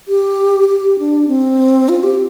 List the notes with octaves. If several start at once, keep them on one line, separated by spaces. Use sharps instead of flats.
G4
G4
D4
C4
F4
G4